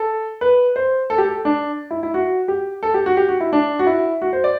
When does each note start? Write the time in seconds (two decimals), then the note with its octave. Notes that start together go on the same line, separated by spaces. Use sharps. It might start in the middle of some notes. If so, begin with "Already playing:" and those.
Already playing: A4
0.41 B4
0.76 C5
1.10 A4
1.18 G4
1.25 A4
1.45 D4
1.91 E4
2.03 E4
2.14 F#4
2.48 G4
2.83 A4
2.94 G4
3.06 F#4
3.17 G4
3.29 F#4
3.40 E4
3.53 D4
3.79 F#4
3.87 E4
4.22 F#4
4.33 C5
4.44 D5